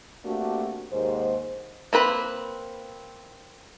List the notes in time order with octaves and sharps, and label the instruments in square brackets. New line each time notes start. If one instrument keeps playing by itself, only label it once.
[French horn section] A3 A#3 C4 D4 F#4 G4
D#2 G#2 C5
[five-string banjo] A#3 C4 B4 B5